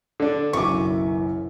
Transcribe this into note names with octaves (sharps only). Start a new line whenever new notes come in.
D3 D4
F#1 B1 F#2 E3 C#6 D6